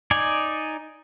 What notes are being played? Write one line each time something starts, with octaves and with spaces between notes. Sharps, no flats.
D#4 D5 G#5